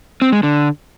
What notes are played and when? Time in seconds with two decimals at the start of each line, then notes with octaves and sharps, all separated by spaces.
0.22 C4
0.32 G#3
0.43 D3